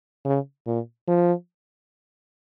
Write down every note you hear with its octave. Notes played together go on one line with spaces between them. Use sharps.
C#3
A#2
F3